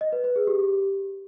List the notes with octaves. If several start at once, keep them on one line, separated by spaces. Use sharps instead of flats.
D#5
B4
B4
G#4
G4